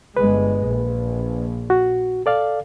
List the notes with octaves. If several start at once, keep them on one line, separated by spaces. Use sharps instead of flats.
G1 G#3 B4
A#1
F#4
A4 D5 F5